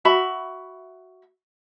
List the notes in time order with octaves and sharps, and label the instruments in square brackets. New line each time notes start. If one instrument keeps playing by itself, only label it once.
[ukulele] F#4 E5 B5